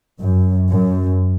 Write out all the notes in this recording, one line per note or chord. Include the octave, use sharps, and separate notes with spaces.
F#2
F#2